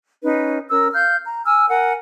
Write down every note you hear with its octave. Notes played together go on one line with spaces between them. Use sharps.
C#4 D#4 B4
C#4 A#4 E6
F5 F6 G6
A#5
G#5 E6 F6
A#4 F#5 G#5